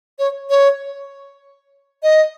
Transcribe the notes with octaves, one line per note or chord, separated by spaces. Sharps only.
C#5
C#5
D#5